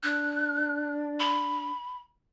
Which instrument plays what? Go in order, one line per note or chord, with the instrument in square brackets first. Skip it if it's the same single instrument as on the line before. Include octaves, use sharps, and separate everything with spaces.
[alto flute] D4 [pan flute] F#6
[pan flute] B5